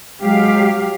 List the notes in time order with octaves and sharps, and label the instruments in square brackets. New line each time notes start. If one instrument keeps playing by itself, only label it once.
[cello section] F#3 G4 F5 [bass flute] G#3